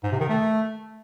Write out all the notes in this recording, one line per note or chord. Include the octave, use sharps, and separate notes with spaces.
G#2
C3
D#3
A3